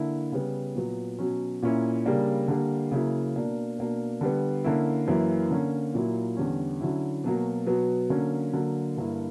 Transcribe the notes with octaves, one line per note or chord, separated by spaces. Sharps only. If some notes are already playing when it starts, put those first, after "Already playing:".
Already playing: D3 A#3 E4
C#3 G3 B3
A#2 F#3 B3
B2 F#3 C#4
A#2 A#3 C#4 E4
C#3 G3 A#3 D4
D3 G3 A#3
C#3 F#3 A#3 E4
B2 A#3 D4
B2 A#3 D4
D3 G3 B3
D3 A#3 C#4 E4
F#2 E3 A#3 E4
D3 A#3 C#4
A#2 F#3 A#3 E4
E2 D3 G3 C#4
D3 F#3 C#4 E4
B2 F#3 A#3
B2 F#3 B3
D3 F#3 A#3 C#4
D3 F#3 A#3
G2 D3 A#3 E4